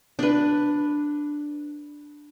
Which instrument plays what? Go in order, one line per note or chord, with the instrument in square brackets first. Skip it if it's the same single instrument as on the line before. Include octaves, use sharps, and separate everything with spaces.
[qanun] D4 B4